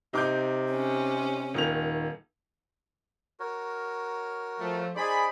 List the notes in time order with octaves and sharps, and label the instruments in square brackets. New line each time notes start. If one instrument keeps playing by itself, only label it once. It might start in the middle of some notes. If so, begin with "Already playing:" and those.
[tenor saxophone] C3 [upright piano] D#4 D6 G6
[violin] C#4
[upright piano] D#1 D#3 F7
[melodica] F#4 A#4 C#5
[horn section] F3 A3
[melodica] D#4 C5 [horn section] G#4 D5 B5